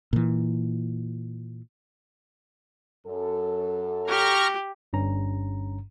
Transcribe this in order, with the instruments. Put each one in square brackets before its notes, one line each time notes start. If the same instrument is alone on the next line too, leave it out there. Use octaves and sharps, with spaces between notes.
[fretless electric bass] A#2 E3
[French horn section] F#2 A4
[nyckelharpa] G4 [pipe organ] A#5 C#6 F6
[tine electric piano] G1 G2 C#4 A#5